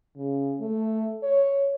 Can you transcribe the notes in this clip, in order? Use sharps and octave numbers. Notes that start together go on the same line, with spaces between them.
C#3
A3
C#5